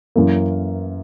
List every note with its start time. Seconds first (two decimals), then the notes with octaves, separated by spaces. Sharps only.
0.16 F#2 E3 A#3